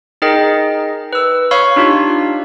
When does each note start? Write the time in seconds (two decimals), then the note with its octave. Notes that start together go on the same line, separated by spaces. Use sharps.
0.22 D#4 G#4 A#4 D#5 G5
1.13 B4 E6
1.51 C#5 F5 B5 C#6 F6
1.76 D4 D#4 F4 G4